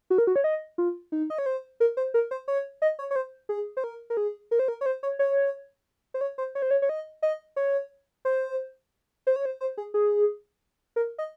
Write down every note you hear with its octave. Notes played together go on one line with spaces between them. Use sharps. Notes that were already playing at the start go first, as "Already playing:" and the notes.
F#4
A#4
F#4
C#5
D#5
F4
D#4
D#5
C#5
C5
A#4
C5
A#4
C5
C#5
D#5
C#5
C#5
C5
G#4
C5
A#4
A#4
G#4
A#4
C5
A#4
C#5
C5
C#5
C#5
C5
C#5
C5
C#5
C5
C#5
C#5
D#5
D#5
C#5
C5
C5
C#5
C5
C5
G#4
G#4
A#4
D#5